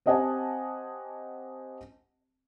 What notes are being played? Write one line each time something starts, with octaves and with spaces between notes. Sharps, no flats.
C4 G4 D#5 F#5 G#5 A5